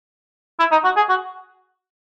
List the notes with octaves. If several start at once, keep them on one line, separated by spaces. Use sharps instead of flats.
E4
D#4
F#4
G#4
F#4